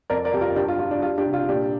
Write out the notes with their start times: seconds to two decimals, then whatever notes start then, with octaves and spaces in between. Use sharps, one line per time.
0.10 F2 A#4 D5
0.25 A#4 D5
0.33 F2 G4
0.41 F4 A#4
0.56 G2 D4 G4
0.68 F4
0.79 G3 F4
0.91 D4
1.02 G3 F4
1.18 D4 G4
1.26 C3
1.33 F4
1.49 A#2 D4 G4